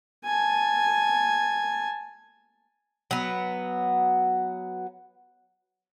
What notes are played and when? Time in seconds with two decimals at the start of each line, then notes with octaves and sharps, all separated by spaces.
0.25 G#5 A5
3.11 F#3 B3